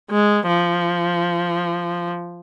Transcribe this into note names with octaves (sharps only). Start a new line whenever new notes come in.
G#3
F3